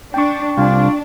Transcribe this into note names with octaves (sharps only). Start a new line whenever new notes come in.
D4 G5 C#6
C2 D4 F4